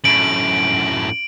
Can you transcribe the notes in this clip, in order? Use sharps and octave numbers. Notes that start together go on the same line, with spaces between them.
F#2 A2 D7 F#7